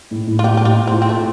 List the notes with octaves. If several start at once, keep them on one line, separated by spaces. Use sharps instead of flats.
A2
A2
F4
A2 G4
G4
A2 F4
A2
C4
F4
C4
A2 A3